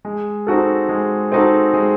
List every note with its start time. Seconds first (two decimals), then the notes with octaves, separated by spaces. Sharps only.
0.05 G#3
0.47 C4 D#4 F#4 A4
0.89 G#3
1.32 C4 D#4 F#4 A4
1.74 G#3